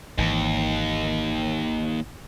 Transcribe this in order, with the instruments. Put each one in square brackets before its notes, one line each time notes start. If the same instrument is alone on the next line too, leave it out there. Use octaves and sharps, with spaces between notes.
[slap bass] G#1 E3 [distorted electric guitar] D#2